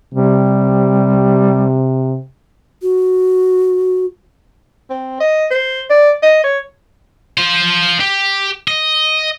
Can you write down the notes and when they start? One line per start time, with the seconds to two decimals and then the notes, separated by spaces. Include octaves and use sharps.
0.14 C3 G3
2.82 F#4
4.90 C4
5.20 D#5
5.51 C5
5.90 D5
6.23 D#5
6.44 C#5
7.38 F4 C5
8.00 G4
8.68 D#5